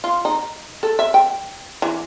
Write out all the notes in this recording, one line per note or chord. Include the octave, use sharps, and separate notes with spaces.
F4
D#4
A4
E5
G5
E3